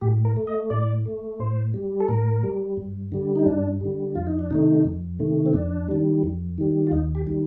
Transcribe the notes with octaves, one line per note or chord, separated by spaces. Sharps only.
A2 G4
A#4
A3
D#5
A2 D5
A3
A2 C5
G3
A4
A2 A#4
G3
G2
D3 G3
D#4
G2 D4
D3 G3
F2 F4
D#4
D4
C3 D#3 A3 D#4
F2
C3 D#3 A3
C4
F2 D4
D#3 G3
F2
D#3 G3
F4
D#2 D#4
G4
D#3 G3